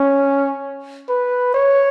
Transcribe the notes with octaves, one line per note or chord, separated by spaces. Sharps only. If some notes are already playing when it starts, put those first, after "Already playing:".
Already playing: C#4
B4
C#5